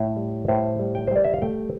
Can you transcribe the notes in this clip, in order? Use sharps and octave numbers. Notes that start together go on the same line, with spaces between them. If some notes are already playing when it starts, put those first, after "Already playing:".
Already playing: A2
G3
A2 C5
G3
G5
C5
G3 D5
E5
F5
A3 G5